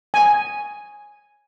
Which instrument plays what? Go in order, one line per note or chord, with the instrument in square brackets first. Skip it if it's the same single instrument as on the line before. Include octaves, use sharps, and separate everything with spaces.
[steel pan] G#5